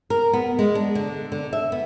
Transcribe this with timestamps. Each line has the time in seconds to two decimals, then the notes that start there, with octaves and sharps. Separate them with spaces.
0.10 A#4
0.33 B3
0.59 G#3
0.75 D4
0.95 D3
1.32 D3
1.53 E5
1.72 B3